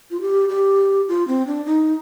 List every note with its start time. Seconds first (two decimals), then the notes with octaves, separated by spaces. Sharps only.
0.11 F4
0.21 G4
0.49 G4
1.08 F4
1.28 C4
1.47 D4
1.66 D#4